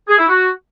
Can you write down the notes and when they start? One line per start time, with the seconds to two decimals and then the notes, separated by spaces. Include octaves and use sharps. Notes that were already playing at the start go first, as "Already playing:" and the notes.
0.09 G#4
0.19 E4
0.29 F#4